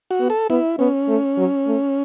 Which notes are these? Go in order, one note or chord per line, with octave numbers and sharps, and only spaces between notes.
F#4
B3
A4
B3 E4
B3 C#4
A3
F#3
A3